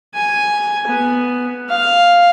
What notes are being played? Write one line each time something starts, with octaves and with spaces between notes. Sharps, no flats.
G#5
B3
F5